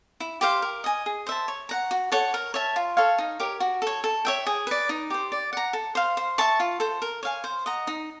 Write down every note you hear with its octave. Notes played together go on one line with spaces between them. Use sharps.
E4
G4 C5 F5
A#4
D#5 G#5
G#4
C5 E5 A5
C#5
F#5 A#5
F#4
A4 C#5 F#5
A#4
C#5 E5 A5
F4
A4 C#5 F5
D#4
G4 A#4 C#5
F#4
A4 C#5
A4
C#5 E5 G5
G#4
B4 D5
D#4
G4 C5
D5
F#5 A#5
A4
C5 F5
C5
E5 A5 C#6
F4
A4 C5
A#4
C#5 F5 G#5
C5
D#5 F#5 A#5
D#4